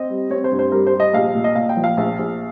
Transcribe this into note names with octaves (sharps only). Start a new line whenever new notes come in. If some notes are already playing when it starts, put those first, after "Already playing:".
Already playing: C4 D#5
G3
C4 C#5
C5
G2
C5
G3 A#4
C5
G3
D#5
A#1 F5
A#2
D#5
A#2 F5
G5
F3
F5
A#1
A#1